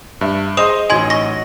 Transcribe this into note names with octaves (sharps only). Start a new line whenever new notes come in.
G2 E5
G#4 C5 D#5 C6 D#6 E7 F7
A1 F#3 D#4 D#5 G#5 C6 G#6
C#6 A#6